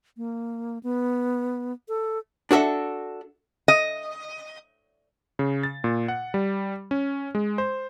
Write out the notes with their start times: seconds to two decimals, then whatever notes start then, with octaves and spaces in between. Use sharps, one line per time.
0.17 A#3
0.83 B3
1.89 A4
2.51 D4 F#4 A4 E5
3.68 D#5
5.39 C#3
5.63 A6
5.84 A#2
6.08 F#5
6.34 G3
6.91 C#4
7.35 G#3
7.58 C5